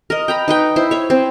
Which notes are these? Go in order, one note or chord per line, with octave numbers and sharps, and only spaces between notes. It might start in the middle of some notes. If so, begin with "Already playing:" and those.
A#4 D#5
G5 A#5 B5
D#4 B4 G5
E4 C5
C#5 E5
C4